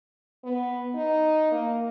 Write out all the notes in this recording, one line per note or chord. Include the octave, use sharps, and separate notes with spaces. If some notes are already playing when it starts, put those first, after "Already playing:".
B3
D#4
A#3